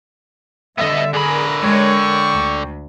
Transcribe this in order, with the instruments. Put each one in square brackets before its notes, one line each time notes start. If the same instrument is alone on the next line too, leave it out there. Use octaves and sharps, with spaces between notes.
[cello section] D3 G3 [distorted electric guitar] B3 D#5 [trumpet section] E5
[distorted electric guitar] D3 B5 [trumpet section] G#4 [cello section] A#4
[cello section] G#3 A#4 C#5 [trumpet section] G5 C#6
[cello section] D2